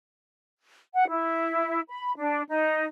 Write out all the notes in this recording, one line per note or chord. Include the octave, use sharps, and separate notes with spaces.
F#5
E4
B5
D4
D#4